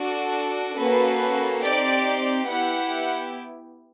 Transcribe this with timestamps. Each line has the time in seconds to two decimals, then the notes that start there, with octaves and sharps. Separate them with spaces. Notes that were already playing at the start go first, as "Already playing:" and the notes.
Already playing: D4 F#4 A4
0.77 A#3 C#4 F#4 A4 B4
1.63 C4 D#4 G4 D5
2.48 B3 E4 G4 F#5